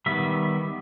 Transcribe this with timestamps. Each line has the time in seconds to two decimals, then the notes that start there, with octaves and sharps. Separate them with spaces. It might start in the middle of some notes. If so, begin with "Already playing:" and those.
0.06 D#3 G3 B3 E5